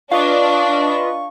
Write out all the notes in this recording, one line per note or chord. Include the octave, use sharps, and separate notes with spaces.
D4 F4 B4 D#5 F5 C#6